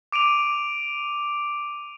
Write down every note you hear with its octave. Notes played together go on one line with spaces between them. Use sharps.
D6 D7 D#7 F7